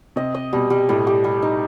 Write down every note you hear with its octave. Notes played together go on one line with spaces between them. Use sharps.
C3 D#5
D#5
B2 G3
G3
A2 G3
G4
G3
D#4